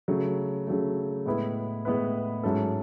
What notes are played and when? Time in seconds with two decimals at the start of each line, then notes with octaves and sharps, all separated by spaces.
0.08 C#3 F#3 A3
0.67 C#3 F#3 A3
1.26 A2 G#3 B3 E4 B4
1.85 A2 G#3 B3 E4 B4
2.43 G#2 F#3 C#4 E4 A4